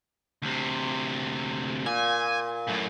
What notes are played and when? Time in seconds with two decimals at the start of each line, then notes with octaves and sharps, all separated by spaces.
0.42 D2 C3
1.86 A#2 G#5
2.67 F#2 A2